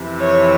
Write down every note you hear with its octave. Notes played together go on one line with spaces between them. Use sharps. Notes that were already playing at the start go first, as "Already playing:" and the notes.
Already playing: F2 C3 E3
C#5